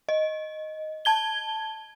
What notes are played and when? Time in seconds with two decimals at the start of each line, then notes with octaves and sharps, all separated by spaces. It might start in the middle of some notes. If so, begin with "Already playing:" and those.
0.09 D#5
1.05 A5 G#6 G7